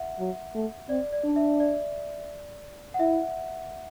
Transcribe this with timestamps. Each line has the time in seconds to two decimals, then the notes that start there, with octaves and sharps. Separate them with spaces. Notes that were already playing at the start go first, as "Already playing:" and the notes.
Already playing: E5 F#5
0.19 F#3
0.55 A3
0.89 C4 D5
1.13 D5
1.24 D4
1.36 E5
1.60 D5
2.94 F#5
3.00 E4 E5